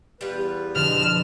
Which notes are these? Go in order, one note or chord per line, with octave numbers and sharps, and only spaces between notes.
E2 G3 F4 B4
F2 B2 D3 F6 E7